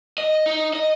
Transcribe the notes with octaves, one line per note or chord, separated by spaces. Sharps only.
D#5
D#4
D#5